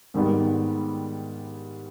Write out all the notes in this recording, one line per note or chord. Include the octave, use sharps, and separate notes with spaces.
G#2 D#3 G3 B3